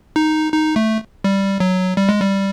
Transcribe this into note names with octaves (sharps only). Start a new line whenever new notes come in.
D#4
D#4
A3
G3
F#3
G3
G#3
G3